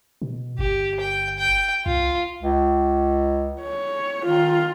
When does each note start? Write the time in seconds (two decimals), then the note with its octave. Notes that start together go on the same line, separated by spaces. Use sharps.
0.22 B2
0.59 G1 G4
1.00 G5
1.38 G5
1.86 C2 F4
2.42 C#2
3.61 C#5
4.26 D#3 F4